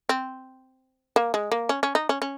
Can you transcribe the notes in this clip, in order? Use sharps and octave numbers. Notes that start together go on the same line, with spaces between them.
C4
A#3
G#3
A#3
C#4
C#4
D#4
C#4
C#4